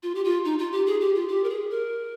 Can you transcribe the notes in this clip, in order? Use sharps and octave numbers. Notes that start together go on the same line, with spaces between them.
F4
G4
F4
D#4
F4
G4
G#4
G4
F4
G4
A#4
G#4
A#4